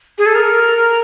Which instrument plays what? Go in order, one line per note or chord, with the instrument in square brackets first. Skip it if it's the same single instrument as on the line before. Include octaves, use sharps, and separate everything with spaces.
[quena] G#4
A4
A#4